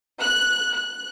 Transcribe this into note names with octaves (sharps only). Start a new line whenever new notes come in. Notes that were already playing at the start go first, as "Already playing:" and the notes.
F#6
F#6